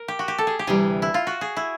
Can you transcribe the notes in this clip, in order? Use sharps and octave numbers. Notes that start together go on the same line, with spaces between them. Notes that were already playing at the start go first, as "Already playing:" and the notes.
Already playing: A#4
G4
F#4
G4
A4
G#4
G4
D2 C3 E3 G3 G#4
E4
F4
F#4
G#4
E4